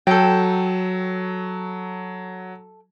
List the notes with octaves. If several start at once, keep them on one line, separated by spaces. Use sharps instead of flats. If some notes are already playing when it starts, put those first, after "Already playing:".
F#3 A4 G5